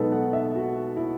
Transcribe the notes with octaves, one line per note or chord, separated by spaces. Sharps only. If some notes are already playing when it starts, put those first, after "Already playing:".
Already playing: B1 B2 G#3 B3 D#4 A4 B4
F#5
E5
F#4
E4